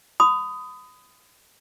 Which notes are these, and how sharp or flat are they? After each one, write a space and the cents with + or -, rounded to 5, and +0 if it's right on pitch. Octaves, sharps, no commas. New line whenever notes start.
B5 +35 D#6 +0